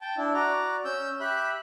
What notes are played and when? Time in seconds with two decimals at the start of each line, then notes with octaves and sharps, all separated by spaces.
0.01 G5 A5
0.17 D4 E4
0.34 F#4 D5 A#5
0.85 C#4 E6 G6
1.20 G4 E5 B5 F#6